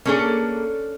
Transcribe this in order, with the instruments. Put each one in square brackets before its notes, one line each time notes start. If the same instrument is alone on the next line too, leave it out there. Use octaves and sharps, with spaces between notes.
[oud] A#3 G#4 [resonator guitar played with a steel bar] C#4 D4 A4